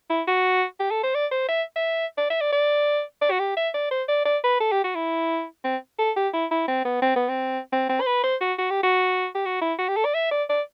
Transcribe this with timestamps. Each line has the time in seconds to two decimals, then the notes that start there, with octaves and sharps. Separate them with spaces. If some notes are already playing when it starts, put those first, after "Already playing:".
0.10 E4
0.27 F#4
0.80 G4
0.91 A4
1.03 C5
1.14 D5
1.31 C5
1.49 E5
1.76 E5
2.18 D5
2.30 E5
2.41 D5
2.53 D5
3.21 D5
3.31 F#4
3.39 G4
3.57 E5
3.74 D5
3.91 C5
4.08 D5
4.25 D5
4.44 B4
4.60 A4
4.72 G4
4.84 F#4
4.95 E4
5.64 C4
5.99 A4
6.16 G4
6.33 E4
6.51 E4
6.68 C4
6.85 B3
7.02 C4
7.16 B3
7.29 C4
7.72 C4
7.89 C4
8.01 C5
8.07 B4
8.24 C5
8.41 F#4
8.59 F#4
8.70 G4
8.83 F#4
9.35 G4
9.45 F#4
9.62 E4
9.79 F#4
9.88 G4
9.97 A4
10.05 D5
10.14 E5
10.31 D5
10.49 D5